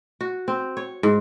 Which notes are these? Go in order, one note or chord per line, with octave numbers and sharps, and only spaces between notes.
F#4
C4
C#5
G#2